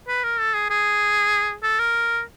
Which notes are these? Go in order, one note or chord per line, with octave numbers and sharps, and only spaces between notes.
B4
A#4
A4
G#4
G#4
A4
A#4